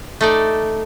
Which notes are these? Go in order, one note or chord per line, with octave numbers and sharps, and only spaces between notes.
A3 D#4 D5